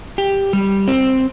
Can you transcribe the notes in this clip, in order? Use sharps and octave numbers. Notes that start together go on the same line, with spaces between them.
G4
G3
C4